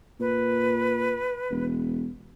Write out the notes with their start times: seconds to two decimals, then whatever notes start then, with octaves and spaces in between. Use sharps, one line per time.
0.20 A#2 B4
1.51 E1